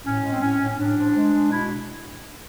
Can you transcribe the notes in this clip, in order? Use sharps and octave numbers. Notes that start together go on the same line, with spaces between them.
A2 C#4
G#3
C4
A2 C#4
A2
C#4
A2 D4
F3
G#3
G#3
B2 E4